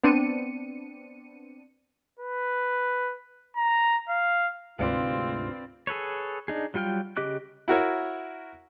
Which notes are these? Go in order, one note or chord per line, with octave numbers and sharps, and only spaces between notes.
B3 C4 D4 C#7 D#7
B4
A#5
F5
D2 G#2 C3 C4 F4 B4 D5 F5
G#4 A4 B4 C#5
D4 D#4 G#4
F#3 G3 F4 G5 F6
C#3 G4 D#5 D6 F#6
E4 F#4 A#4 C#5